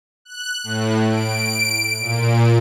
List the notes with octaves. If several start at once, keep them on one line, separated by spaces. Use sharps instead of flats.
F#6
A2
D7
A#2